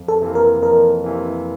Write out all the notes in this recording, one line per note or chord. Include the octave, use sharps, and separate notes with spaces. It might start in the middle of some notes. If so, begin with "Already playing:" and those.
Already playing: F2
A4
C3 E3 A#3
A#4
F2 A#4
C3 E3 A#3